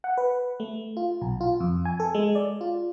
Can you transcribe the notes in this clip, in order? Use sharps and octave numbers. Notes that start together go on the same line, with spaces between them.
F#5
B4
A3
F4
B1
F4
F2
G#5
A4
G#3
D5
F4